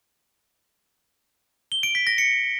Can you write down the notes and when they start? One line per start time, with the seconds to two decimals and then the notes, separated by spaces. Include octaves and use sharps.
1.72 G7
1.83 D7
1.95 B6
2.07 A#6
2.18 C#7